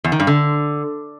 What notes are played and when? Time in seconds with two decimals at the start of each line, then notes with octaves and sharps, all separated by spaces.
0.04 E2
0.12 D#3
0.20 G2
0.27 D3